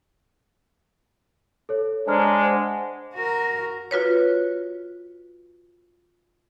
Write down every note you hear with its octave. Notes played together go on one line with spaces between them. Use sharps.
A4 C#5
G#3 D4 C5 A#5 F6
C5 F#5
F#4 A#4
F4 F#4 B4 C#5